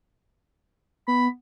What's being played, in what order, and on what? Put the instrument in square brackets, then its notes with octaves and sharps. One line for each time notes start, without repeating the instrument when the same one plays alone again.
[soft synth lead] B3 [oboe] B5